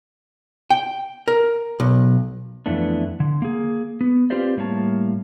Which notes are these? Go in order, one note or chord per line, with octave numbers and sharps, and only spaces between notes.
G5
A#4
B1
F2 E3 A3 B3 D4
D3
A#3 G#4
B3
C4 F4 G4 B4 C5 D5
A2 G3 A#3 C#5 A5